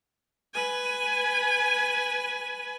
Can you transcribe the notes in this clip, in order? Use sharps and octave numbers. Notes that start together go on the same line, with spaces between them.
B4 G#5